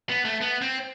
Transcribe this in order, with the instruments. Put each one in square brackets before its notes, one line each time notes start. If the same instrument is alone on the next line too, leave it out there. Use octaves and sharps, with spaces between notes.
[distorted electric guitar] B3
A3
B3
C4